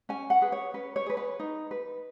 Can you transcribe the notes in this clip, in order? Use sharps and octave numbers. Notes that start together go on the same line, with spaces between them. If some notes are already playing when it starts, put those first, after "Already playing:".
C#4 G#5
F#5
G#4 B4
C#5
C#4 B4
C#5
G#4 B4
B4
D#4
B4